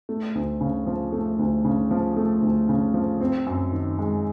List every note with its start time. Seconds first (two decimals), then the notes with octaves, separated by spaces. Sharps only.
0.09 A3
0.35 D2
0.61 C#3
0.87 F3
1.12 A3
1.39 D2
1.65 C#3
1.91 F3
2.17 A3
2.42 D2
2.69 C#3
2.94 F3
3.21 C4
3.47 F#2
3.72 D#3
3.99 G#3